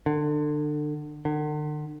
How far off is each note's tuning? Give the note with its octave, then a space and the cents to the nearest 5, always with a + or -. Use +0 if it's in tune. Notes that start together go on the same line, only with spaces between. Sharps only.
D3 +30
D3 +45